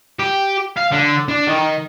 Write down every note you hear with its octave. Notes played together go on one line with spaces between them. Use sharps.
G4
F5
D3
D4
D#3